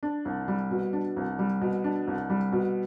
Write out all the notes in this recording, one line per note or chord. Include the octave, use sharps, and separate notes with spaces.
D4
C2
G3
B2
D4
C2
G3
B2
D4
C2
G3
B2